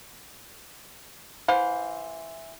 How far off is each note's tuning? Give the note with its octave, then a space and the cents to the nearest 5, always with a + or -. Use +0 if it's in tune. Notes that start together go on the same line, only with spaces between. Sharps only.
E3 +0 C5 +0 F5 +40